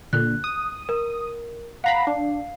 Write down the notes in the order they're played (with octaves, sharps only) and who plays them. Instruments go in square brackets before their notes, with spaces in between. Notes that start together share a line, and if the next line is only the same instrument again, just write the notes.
[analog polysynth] A#2 D3 [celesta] F#6
[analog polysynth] D#6
[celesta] A#4
[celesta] F5 C7 [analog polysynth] F#5 A#5 B5
[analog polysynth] D4